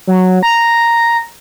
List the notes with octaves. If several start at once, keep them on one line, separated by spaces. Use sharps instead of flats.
F#3
A#5